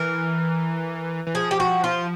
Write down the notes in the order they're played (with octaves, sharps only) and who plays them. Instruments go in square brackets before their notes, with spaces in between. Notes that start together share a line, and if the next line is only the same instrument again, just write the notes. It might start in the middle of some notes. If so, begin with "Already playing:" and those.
Already playing: [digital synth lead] E3 [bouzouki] A#4
[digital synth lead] E3
[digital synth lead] F3 [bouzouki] G#4
[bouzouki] G4
F#4
F4